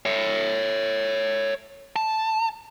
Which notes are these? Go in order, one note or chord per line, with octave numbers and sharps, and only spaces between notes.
C#5 E5
A5